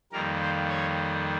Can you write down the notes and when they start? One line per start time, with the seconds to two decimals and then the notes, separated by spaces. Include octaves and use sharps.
0.12 F2 D#3 G3 A#3 A#4
0.42 C5
0.69 C#5